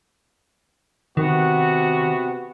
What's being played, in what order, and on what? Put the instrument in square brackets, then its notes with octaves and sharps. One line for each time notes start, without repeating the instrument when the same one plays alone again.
[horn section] C3 B3 F#4 [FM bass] D#3